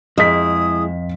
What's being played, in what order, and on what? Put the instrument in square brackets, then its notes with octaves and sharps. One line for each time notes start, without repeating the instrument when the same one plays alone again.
[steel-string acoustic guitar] F2 [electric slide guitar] G#3 E4 G#4 [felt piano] D#5 B6 [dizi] D#6